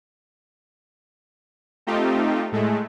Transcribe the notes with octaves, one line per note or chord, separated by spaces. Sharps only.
A3 C4 D#4 F4 G4
A2 G#3 A3